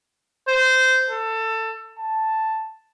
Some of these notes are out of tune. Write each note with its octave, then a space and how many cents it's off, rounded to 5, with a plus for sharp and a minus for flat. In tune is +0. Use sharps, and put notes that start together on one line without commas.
C5 -15
A4 +20
A5 +0